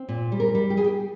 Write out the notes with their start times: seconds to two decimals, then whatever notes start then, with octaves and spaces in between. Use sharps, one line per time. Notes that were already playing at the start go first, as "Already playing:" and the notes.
Already playing: C4
0.09 A#2
0.32 G3
0.40 A#4
0.55 G3
0.70 G4
0.77 G3 G#4
0.84 G4